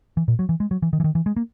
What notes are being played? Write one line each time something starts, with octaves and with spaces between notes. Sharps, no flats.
E3
A#2
F#3
E3
G#3
F#3
E3
D#3
E3
D#3
E3
G#3
A#3